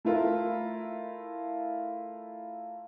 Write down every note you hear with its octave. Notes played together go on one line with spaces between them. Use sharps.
A3 E4 F4 A#4